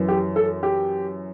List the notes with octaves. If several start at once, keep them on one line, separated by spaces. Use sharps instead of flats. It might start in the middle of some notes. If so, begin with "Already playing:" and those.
Already playing: F#2 E3
G4
A4
G4